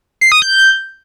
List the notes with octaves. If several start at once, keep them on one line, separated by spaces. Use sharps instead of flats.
C7
D#6
G6